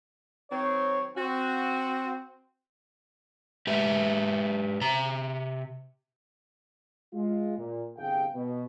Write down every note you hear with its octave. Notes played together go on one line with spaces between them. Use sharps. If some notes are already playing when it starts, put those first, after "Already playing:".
D#3 F#3 C4 C#5
C4 F#4
G#3 G4 B4 E5
C3 A#5
G#3 F4
A#2
G1 C2 G#4 F5 G5
B2